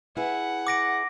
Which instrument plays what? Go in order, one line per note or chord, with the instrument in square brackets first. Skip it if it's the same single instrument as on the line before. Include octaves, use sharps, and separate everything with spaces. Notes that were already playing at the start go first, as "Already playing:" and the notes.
[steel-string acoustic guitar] E4 G#4 B4 [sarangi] F#5
[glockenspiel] D6 A#6 D7